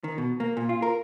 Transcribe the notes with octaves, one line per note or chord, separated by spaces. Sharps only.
D#3
B2
A#3
A#2
F4
A#4